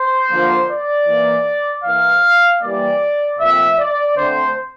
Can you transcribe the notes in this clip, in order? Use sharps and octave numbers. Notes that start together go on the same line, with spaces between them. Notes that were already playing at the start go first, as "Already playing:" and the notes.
Already playing: C5
D3 F3 A#3
D5
E3 A#3
E3 A#3 F5
E3 G3 A#3 D5
A#2 F3 A3 C4 E5
D5
D3 A3 C4 C5